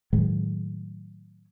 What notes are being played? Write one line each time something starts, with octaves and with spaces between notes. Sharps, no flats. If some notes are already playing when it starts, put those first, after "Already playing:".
A2 D#3 F#3 G#3